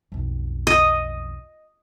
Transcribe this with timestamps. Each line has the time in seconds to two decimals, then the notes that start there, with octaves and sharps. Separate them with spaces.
0.12 B1 F2
0.67 D#5